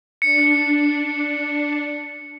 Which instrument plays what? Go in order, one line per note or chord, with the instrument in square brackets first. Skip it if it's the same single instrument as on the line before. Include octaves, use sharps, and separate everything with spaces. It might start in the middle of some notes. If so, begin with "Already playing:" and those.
[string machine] D4 [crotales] C#7